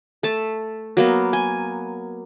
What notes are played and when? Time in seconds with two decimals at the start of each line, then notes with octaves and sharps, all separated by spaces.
0.23 A3 A5
0.97 F#3 A#3 B3
1.33 G#5